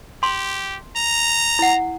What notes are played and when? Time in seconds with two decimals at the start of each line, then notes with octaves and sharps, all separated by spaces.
0.23 G4 C6
0.96 A#5
1.59 E4 F#5